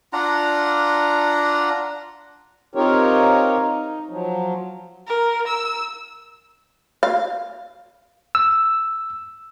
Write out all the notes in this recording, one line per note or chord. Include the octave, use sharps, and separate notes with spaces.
D4 F4 F#5 A#5
C4 D#4 F4 G4 A#4 C#5
D#4
F3 F#3
A#4
E6
F5
E6